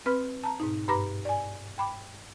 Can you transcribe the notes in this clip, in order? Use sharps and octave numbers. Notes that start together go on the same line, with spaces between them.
C4 B4 B5 F6
A5 A#5
G#2 B2 D#4
G2 B4 A#5 B5 D6 A#6
D5 G#5
G5 B5 D6